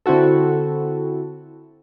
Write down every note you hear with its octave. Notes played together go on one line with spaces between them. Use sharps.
D3 C4 E4 F#4 A4